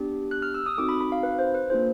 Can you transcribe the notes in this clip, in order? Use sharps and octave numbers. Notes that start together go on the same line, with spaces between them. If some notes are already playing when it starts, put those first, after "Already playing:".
Already playing: B3 D4 G4
F#6
F6
E6
D#6
C4 D#4 F#4 A4 D6
B5
B5
F5
B4
C5
B4
A#3 D4 F4 G#4 C5